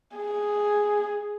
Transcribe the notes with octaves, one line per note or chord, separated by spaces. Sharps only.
G#4